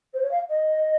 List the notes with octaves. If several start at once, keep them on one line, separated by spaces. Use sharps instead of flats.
C5
C#5
F5
D#5